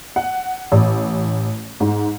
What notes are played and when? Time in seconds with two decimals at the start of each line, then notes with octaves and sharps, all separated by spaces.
0.16 F#5
0.72 A1
1.80 G#2